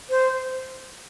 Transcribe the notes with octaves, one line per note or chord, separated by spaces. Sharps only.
C5